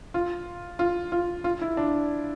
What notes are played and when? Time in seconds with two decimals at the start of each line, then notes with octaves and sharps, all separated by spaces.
0.14 F4
0.79 F4
1.12 F4
1.44 F4
1.61 E4
1.77 D4